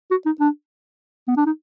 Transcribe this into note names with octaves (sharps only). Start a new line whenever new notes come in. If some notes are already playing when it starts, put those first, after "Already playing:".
F#4
D#4
D4
B3
D4
D#4